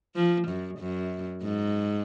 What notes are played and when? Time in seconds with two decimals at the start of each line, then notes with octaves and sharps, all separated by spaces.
0.15 F3
0.48 F#2
0.79 F#2
1.43 G#2